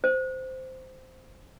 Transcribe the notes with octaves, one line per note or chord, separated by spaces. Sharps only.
C5